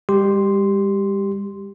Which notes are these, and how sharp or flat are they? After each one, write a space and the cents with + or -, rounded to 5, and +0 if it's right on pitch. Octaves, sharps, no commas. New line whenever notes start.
G3 +45 G4 +0 C6 +0